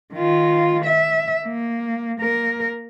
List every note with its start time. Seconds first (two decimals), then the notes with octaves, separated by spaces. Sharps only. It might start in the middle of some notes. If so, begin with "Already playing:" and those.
0.14 D#3 F4
0.85 E5
1.47 A#3
2.21 A#3 A#4